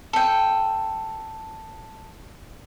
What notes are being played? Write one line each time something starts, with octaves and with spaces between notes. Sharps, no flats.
A4 G5